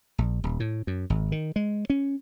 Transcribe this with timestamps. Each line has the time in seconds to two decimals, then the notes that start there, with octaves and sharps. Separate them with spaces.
0.18 A#1
0.44 D#1
0.60 A2
0.87 F#2
1.10 G#1
1.32 D#3
1.56 G#3
1.90 C#4